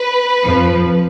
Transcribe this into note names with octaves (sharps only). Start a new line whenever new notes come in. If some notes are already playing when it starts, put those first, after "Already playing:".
Already playing: B4
F2 F3